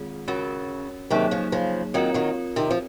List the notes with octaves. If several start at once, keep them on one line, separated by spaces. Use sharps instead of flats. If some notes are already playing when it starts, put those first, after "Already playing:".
Already playing: D#3 G#3 C4 F4 G#4
C#3 C#4 F#4 A#4 C#5
C3 D#3 F#3 A#3 D#4 G#4 C#5
C#3 F3
C#3 F3
D#3 F#3 C4 F4 A#4 C#5
D#3 F#3
C3 D#3
F3